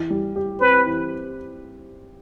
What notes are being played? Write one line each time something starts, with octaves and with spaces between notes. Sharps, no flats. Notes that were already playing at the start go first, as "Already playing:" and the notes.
Already playing: E3
G3
G4
C4 B4
E3